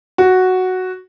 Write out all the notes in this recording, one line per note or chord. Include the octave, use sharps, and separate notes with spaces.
F#4